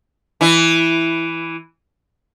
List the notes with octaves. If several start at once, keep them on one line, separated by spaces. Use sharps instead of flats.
E3 E4